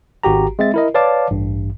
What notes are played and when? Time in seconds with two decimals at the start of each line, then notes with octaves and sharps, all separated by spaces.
0.23 G#1 F#4 G4 A#5
0.59 G#3 C4 E5 A6
0.74 E4 A#4 D#5
0.94 B4 C#5 D5 F5 A5 D6
1.31 A1 G2